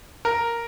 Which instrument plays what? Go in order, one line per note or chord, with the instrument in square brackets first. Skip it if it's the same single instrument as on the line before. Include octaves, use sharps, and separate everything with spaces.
[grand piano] A#4